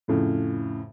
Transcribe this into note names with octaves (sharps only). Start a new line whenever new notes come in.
F2 A2 C#3